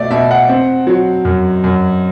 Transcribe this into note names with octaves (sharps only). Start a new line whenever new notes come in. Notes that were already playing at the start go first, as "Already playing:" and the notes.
Already playing: B2 A3 D5 E5
B2 E5
F#5
C4
F#3
F#2
F#2